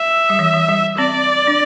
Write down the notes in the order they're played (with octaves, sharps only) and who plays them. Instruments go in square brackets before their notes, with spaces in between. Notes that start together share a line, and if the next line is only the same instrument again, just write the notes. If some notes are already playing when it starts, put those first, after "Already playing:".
Already playing: [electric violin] E5
[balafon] G3
E3
E3
G3
[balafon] C4 [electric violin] D5
[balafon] D4